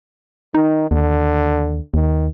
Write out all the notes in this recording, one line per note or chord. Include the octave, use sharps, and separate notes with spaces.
D#3 D#4
D#2 D3
D#2 D#3